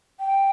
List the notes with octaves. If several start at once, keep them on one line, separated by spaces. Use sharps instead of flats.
G5